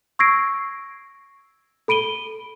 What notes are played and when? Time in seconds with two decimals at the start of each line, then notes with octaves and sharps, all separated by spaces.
0.19 C#6 E6 G#6 A#6 C7 D7
1.88 A4 B5 D7 D#7 G7